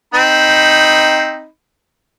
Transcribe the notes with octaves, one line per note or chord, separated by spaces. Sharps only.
C4 D#4 B5